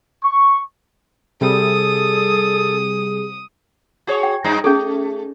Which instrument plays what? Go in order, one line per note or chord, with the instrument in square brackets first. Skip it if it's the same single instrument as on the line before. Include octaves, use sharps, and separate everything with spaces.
[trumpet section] C#6
[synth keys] C3 G3 [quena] G#4 [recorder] A4 [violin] D#6
[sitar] F#4 G#4 C#5
[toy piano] G5
[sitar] G2 D#4
[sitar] A3 [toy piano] C#4 G#4 A4